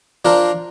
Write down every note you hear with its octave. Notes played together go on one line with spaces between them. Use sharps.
F3 D4 F4 A#4